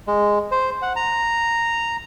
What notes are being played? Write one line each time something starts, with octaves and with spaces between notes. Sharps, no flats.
G#3
C5
F#5
A#5